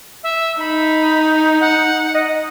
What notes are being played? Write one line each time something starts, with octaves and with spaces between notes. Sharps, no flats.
E5
D#4 B5
F#5
D#5